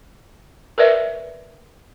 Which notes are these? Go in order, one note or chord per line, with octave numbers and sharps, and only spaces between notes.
A#4 B4 D5 E5